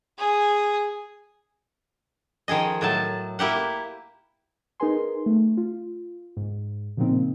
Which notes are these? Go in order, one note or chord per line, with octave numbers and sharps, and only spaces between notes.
G#4
D#3 F3 G#4 D#5
A2 F#3 A5
A#3 E4 G4 F#5
D#4 G#4 A#4 B4 G#5 C6
A3
F4
G#2
A#2 C#3 F3 A#3 C4 D#4